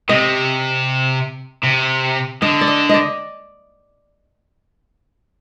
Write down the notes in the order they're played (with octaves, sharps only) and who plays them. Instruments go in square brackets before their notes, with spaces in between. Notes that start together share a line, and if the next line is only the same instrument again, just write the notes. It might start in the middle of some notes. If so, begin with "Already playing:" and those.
[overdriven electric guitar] C3 [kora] D#5
[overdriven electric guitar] C3
[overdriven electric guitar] D3 [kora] D#5
[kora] D5
D#5
D5 D#5